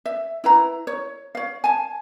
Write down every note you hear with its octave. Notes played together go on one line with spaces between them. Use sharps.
E5
E4 B4 A#5
C#5
C#5 F5
G#5 A5